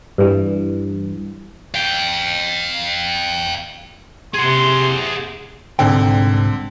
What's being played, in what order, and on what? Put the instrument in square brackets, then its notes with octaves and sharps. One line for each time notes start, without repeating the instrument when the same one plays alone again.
[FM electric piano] G2 E3
[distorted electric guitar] F5 G5
[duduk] C3 [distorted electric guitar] G#4 F#5 [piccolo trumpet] C6
[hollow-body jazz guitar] C2 G#2 G5 [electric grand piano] D3 C4